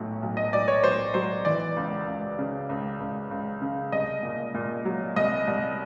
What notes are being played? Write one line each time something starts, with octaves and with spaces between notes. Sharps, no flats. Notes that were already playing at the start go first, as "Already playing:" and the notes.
Already playing: B1 A2 F#3
B1
D#5
B1 D5
C#5
B1 C5
F#3 C5
E3 D5
C#2
C#2
C#3
C#2
C#2
C#2
C#3
C2 D#5
A#2
A#2
F#3
C2 D#5
C2